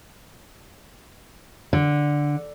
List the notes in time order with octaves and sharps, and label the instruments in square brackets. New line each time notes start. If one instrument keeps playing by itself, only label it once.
[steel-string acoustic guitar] D3